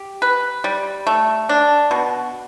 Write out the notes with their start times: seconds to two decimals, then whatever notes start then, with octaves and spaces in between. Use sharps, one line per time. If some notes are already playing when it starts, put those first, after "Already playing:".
Already playing: G4
0.22 B4
0.64 G3
1.07 A3
1.49 D4
1.91 B2